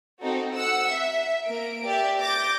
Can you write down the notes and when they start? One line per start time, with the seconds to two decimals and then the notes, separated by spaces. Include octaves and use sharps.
0.22 C4 D#4 F#4 A4
0.55 F#5 E6 C#7
0.89 E5
1.46 A#3 A#4 D7
1.85 G4 D5 E5
2.20 D6 G6 A6 A#6